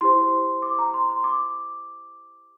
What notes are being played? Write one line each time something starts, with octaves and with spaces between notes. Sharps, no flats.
E4 G4 C5 C6
D6
A#5
C6
C6
D6